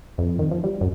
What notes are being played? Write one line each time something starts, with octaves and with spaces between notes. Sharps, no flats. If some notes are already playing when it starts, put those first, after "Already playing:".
F2
D#3
F3
G3
F#2